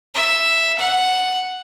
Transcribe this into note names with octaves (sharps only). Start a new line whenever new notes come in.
E5
F#5